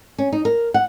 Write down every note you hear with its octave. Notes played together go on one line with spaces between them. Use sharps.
C#4
D#4
A#4
F#5